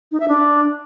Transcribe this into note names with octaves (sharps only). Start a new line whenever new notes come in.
D#4
E5
D4